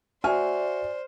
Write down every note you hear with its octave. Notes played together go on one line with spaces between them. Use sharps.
F#4 C5 D5 E5 G#5 F6